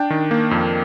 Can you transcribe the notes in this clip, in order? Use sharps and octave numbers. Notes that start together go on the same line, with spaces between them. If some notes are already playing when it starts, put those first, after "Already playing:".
Already playing: D4 G5
D#3
A#3
F2